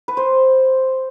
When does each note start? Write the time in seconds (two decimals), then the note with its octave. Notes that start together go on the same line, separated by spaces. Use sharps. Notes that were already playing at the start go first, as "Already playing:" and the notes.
0.08 B4
0.17 C5